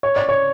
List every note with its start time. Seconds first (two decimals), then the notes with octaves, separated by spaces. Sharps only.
0.03 C#5
0.16 D5
0.29 C#5